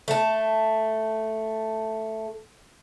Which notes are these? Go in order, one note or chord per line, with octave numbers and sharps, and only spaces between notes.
A3 A5